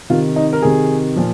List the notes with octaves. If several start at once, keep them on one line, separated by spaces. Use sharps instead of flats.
C3 D#3 F4
D#4
A#4
C3 D#3 G#4
A#2 F3